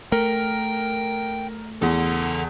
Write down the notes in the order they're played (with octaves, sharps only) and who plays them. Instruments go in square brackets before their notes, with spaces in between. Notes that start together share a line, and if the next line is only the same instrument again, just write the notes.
[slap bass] A3 [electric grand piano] A#4 [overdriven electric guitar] G5
[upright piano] E2 [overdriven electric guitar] A4 F#5